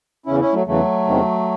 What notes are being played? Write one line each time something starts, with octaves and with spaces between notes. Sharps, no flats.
E2 C#3 E3 C#4 E4
C#4 E4
F#3 A3
E2 C#3 E3 F#3 A3
E2 C3 D#3